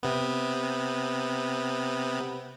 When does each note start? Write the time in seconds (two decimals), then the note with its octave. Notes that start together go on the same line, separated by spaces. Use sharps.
0.03 C3 B3